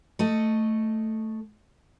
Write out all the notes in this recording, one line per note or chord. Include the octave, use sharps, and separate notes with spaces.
A3 A4 D#5